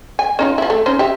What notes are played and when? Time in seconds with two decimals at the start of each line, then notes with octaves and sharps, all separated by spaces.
0.19 G#5
0.39 C#4 D#4 F4
0.58 F3 E4
0.70 A3
0.86 C#4 D#4 C5
0.99 G4 E5